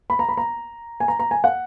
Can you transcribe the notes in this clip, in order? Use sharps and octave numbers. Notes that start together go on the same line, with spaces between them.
B5
A#5
B5
A#5
G#5
A#5
A#5
G#5
F#5